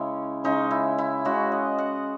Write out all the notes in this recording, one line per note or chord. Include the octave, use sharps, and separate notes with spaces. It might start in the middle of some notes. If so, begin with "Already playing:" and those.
Already playing: C#3 G#3 C#4 E4
C#3 G#3 C#4 D#4
E4
E4
C#3 G#3 C#4 F#4
D#5
F#5